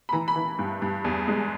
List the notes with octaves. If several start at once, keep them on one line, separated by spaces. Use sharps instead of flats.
B5
E3 A#5
B5
E3
G2
G2
E2
G#3